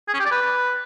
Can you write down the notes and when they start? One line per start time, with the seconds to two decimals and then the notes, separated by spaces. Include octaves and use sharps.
0.08 G#4
0.14 C#4
0.20 G4
0.26 D5
0.32 B4